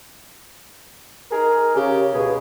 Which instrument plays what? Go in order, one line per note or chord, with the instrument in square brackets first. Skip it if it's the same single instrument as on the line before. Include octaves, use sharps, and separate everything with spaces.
[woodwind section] D#4 G#4 A#4
[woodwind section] C#3 [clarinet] G4
[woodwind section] C#2 B2 [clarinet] G#4